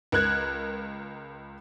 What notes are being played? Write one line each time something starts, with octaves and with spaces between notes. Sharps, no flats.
C#2 A#4 F#6 G#6